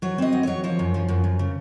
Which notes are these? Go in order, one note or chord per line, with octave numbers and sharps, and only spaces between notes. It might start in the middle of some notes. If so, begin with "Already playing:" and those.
F#3 C#5
C4 D#5
F#3
F#3 C#5
F3 C#5
F#2
F3
F#2
F#2
C#3